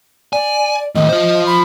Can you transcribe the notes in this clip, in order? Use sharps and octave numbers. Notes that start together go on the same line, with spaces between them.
D5 G#5
A2 D#3 D#5
F4 C5
B5